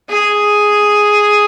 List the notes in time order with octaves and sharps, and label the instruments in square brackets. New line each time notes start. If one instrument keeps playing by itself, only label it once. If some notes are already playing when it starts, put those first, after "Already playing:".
[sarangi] G#4